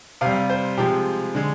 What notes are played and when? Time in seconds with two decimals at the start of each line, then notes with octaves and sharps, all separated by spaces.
0.21 C3 F5
0.26 G3
0.50 C5
0.78 C3 F3 G#3 G4
1.35 D3 G#3